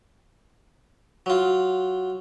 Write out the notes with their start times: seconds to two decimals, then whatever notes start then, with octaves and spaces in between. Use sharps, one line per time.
1.26 F#3 F4